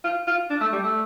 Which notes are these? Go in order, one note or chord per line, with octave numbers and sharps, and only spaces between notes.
F4
F4
D4
A3
G3
A3